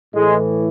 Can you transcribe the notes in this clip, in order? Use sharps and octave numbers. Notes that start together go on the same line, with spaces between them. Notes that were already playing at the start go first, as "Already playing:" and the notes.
A2 E3 G#3